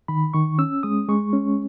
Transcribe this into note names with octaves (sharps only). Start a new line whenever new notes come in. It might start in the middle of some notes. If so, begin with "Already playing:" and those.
D#3 B5
D#3 C#6
C#4 E6
G#3 D#6
G#3 C#6
C#4